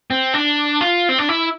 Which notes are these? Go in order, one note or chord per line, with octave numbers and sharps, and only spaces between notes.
C4
D4
F4
C4
D4
E4